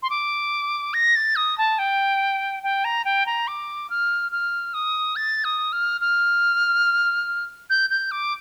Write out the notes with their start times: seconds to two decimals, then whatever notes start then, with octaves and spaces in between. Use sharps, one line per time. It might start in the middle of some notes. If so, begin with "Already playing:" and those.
0.03 C6
0.10 D6
0.94 A#6
1.16 A6
1.36 D#6
1.58 A5
1.79 G5
2.63 G5
2.84 A#5
3.05 G5
3.26 A#5
3.48 D6
3.90 F6
4.32 F6
4.74 D#6
5.16 A6
5.44 D#6
5.72 F6
6.01 F6
7.70 G6
7.90 G6
8.11 D6